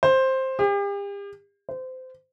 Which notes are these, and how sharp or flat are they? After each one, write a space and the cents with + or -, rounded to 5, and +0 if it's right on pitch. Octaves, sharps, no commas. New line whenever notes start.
C5 +10
G4 +40
C5 -25